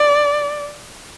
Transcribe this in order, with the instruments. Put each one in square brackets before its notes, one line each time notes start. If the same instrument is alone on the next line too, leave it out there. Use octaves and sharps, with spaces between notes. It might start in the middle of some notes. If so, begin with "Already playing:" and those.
Already playing: [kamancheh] D5